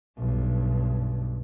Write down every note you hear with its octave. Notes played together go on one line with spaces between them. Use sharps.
B1 G2